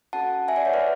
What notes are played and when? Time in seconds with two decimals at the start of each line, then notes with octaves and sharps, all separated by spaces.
0.13 C#4 F#4 A4 F#5 A5
0.48 E5 G#5
0.56 D5 F#5
0.65 C#5 E5
0.74 B4 D5